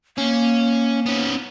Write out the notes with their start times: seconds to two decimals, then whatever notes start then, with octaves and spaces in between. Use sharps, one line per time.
0.18 A#3 C#4
1.06 B3 C#4